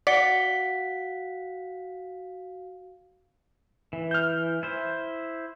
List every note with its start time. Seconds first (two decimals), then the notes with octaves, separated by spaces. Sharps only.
0.07 F#4 D5 F5 F#5 B6 C#7 G7
3.93 E3
4.11 F6 G6
4.63 E4 C5